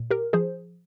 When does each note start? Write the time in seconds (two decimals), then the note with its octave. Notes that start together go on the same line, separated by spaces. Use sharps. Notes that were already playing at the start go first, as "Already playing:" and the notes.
Already playing: A#2
0.11 G4 A#4
0.33 F3 G#4 C5